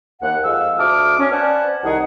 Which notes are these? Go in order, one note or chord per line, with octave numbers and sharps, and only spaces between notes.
D#2 F#5
F2 G#3 F5 E6
D2 E5 A5 D6 D#6 F6
C#4
B4 C5 D5 F#5 G#5 A5
C2 D#3 D#4 G#4 D#5 F#5